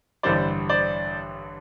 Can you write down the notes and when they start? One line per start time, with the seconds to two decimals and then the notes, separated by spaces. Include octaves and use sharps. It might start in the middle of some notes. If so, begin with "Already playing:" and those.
0.23 A1 G2 D3 G3 C5 D5
0.69 C5 D5